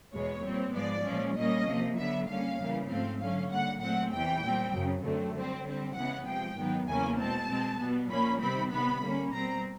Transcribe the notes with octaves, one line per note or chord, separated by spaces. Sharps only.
E2 B2 G#3 C#5
A#2 G3 C4
G#2 F3 G#3 B3 D5
A#2 F3 G#3 C#4
A#2 G3 A#3 C#4 D#5
C3 F3 A#3
D3 F#3 B3 E5
D3 G3 A#3 C#4 F5
E2 C#3 E3 G3 A#3
G#2 F3 A3 C4 F5
D3 F#3 A3 C#4 F5
D3 G3 A#3 F#5
A#2 F#3 A3 C4 F#5
E2 C3 E3 G5
A#2 G3 C4
F#2 C#3 F#3
F#2 D3 F#3 A3 C4
D3 G3 C4
D3 G3 C4
C#3 E3 G#3 B3 F#5
C3 F3 G#3 G5
G#2 D#3 F#3 B3
E2 C#3 F#3 A#3 C#4 G#5
B2 G#3 C4 A5
B2 G#3 C4
B2 G3 B3
A#2 F3 A#3 C#4 B5
C3 D#3 G3 C4 B5
C3 D#3 G3 B3 B5
D3 G3 A#3 C#4
B2 G3 C4 A#5